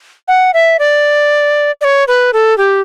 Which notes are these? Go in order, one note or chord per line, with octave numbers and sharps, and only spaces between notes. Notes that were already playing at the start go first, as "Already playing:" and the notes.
F#5
E5
D5
D5
C#5
B4
A4
G4